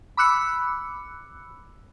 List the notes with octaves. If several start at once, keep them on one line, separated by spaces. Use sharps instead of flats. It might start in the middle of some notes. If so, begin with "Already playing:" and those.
B5 D6 E6 F#6 C#7